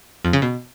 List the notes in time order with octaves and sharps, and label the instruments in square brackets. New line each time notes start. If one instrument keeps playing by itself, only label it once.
[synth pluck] F2
C#3
B2